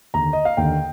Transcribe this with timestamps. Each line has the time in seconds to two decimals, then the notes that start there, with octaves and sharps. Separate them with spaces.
0.14 D#2 D3 A#5
0.33 D#5
0.45 F5
0.57 D#2 D3 G5